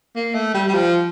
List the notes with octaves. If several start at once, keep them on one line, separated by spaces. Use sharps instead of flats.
A#3
A3
G3
G3
F3